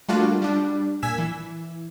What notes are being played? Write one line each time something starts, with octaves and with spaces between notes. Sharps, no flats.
G3 A3 A#3 D4 F4 F#4
G3 D4
A#2 G#5 E6 G#6 B6 E7
E3